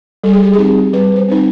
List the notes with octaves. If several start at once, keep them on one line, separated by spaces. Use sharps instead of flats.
G3 A4
G#4
G4
C4 D#4 G#4
G3 B4
C5
C4 D#4